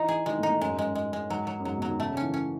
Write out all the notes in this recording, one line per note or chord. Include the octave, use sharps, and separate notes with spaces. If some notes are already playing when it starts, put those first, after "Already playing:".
Already playing: E3 D#4
G#4
D#3 G#3
A2
D#4
A2
F#2 G#3
G#2
F#2 G#3
G#3
G#3
G#2 F#3
F#3
F#2
G#2 F#3
B2
F#3
D#3
C#3 A3
C#3
C#4
E3
C#4